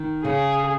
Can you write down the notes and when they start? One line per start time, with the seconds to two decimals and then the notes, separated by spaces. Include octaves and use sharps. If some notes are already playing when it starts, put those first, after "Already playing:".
Already playing: D#3
0.24 C#3 G#4